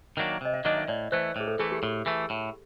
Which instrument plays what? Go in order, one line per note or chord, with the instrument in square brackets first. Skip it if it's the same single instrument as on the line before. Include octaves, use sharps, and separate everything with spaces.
[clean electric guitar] D#3 F#3 A#3 D4
[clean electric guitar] C3 [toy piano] D#5
[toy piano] E5
[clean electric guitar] D#3 F#3 A#3 D4 [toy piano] D#5
[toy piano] E5
[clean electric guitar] A2 [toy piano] D5
[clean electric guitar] E3 A3 [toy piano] C5
[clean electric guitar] A2 [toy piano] G#4
[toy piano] A4
[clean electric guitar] E3 A3 [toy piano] G#4
[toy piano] G4
[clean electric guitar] A2
E3 A3
A2